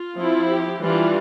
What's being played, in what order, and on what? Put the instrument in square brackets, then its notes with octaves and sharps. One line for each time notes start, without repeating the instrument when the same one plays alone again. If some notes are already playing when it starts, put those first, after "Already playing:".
Already playing: [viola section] F4
F3 C4 E4
G4
E3 G3 D4 F4